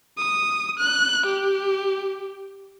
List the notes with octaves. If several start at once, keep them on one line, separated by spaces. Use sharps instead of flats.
D#6
F#6
G4